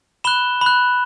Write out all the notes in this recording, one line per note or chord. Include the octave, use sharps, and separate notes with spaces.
B5 F#6 E7 G7
B5 F#6